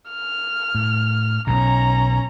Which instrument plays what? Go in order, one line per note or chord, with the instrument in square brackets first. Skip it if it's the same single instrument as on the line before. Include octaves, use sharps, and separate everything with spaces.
[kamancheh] F6
[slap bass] A2
[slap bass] B1 B2 [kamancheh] C#4 A#5